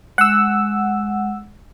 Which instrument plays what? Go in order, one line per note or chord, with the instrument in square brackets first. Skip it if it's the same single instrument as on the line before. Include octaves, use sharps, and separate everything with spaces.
[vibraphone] G#3 [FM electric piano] F#5 E6